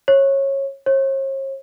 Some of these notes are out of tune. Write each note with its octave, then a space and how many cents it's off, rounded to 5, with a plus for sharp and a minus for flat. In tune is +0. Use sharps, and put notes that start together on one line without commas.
C#5 -20
C#5 -45